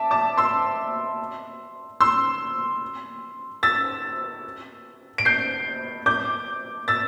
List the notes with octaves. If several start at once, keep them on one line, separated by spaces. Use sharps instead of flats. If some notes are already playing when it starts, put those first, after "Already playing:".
Already playing: E5 A5 D6
A5 D6
C6 E6
C6 E6
E6 A6
D7
G6 C7
D6 G6
E6 A6